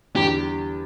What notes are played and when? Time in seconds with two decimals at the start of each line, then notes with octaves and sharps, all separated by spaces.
0.16 E2 D3 G3 G4